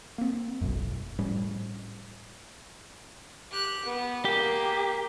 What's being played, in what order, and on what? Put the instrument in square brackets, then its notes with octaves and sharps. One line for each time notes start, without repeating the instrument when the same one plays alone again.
[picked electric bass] A#3 C4
F#1 B1 F#2
A2 F3 G3 C#4
[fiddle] G4 F#6
B3
[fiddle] A#3 G#4 [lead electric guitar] G4